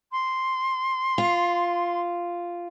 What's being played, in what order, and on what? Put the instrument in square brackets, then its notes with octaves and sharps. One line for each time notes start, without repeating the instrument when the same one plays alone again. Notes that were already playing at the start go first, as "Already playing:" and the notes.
[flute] C6
[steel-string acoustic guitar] F4